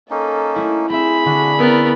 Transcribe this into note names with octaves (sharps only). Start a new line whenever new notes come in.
A#3 C#4 D#4 A4
A3 E4
C4 G#4 E5 B5
D3 D4 F#4
B3 C#4 E4 A#4 E5 A6